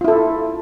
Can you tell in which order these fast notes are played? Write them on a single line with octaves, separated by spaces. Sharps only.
F4 E4 A4